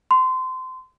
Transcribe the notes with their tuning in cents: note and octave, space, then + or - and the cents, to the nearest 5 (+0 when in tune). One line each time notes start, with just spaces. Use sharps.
C6 -25